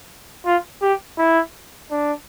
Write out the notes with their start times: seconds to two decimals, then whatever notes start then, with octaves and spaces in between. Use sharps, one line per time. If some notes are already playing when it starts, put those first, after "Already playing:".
0.46 F4
0.82 G4
1.18 E4
1.91 D4